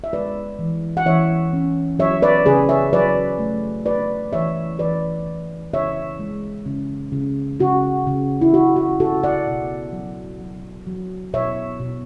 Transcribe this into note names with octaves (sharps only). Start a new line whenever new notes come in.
E5
G#3 B4 D5
E3
F#5
E3 C#5 E5
C#4
F#3 C#5 E5
B4 D5
C#3 G#4 B4
C#5 E5
F#3 B4 D5
A3
D4 B4 D5
E3 C#5 E5
E3 B4 D5
E3
C#3 C#5 E5
G#3
C#3
C#3
C#3 F#4
C#3
E4
D4 F#4
F#4
C#3 F#4 A4
D5 F#5
B2
F#3
F#3
F#3
B2 C#5 E5
B2